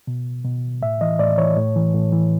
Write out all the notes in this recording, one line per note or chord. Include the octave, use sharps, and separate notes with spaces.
B2
B2
A2 E5
E3 D#5
A2 D5
E3 C#5
A2
E3
A2
E3